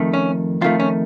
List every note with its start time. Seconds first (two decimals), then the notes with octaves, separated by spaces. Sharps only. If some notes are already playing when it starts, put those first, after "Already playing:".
Already playing: F2 D#3 A3
0.14 C#4
0.61 F2 D#3 A3 F4
0.80 C#4